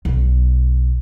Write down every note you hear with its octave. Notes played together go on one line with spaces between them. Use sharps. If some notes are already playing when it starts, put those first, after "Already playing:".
B1